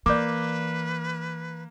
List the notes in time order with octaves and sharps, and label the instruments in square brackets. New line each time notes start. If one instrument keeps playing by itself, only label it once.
[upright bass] E3 [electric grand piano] A#3 [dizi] B4 [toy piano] D5 D6